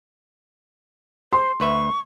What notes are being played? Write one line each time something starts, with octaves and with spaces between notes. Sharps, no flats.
C5 C6
D2 B4 E5 C#6